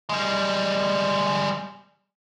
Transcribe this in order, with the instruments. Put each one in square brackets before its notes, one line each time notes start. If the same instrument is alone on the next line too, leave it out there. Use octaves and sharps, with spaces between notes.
[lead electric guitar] G3 G#3